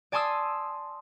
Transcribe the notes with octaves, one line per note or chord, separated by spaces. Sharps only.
D5 G#5 A5 C6 D#6 E6